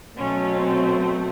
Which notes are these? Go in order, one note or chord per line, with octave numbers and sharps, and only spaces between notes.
B2 F#3 A3 C#4
C4